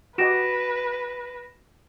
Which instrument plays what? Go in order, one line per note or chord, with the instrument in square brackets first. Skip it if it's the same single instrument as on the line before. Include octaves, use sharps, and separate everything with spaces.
[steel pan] F#4 G4 D#5 [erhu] B4 [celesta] A#6 D7 E7